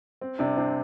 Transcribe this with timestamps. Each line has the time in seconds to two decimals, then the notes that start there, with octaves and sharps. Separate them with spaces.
0.21 C4
0.39 C3 D4
0.57 C4 D4